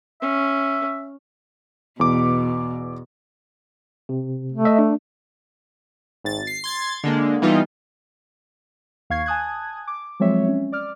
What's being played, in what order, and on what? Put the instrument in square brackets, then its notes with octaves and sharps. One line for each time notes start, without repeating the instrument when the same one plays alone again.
[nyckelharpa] C#4 [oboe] E5
[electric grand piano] E2 D6 [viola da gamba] B2
[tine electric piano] C3
[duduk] A3
[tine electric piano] D#5 E5
D4
[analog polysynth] G#1 A6
C7
C6 G#6 A6
D3 G#3 A#3
E3 G3 B3 D#4 F4
[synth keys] D#2 F5 C#6 G#6 C7
G#5 A5 D#6 F#6 G#6
D6
F3 F#3 G#3 C4 C#5 E5
C#4
D5 D6 F6